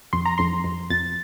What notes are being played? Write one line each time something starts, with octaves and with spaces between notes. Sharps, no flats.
F2 C6
A#5
F2 C6
F2
F2 A6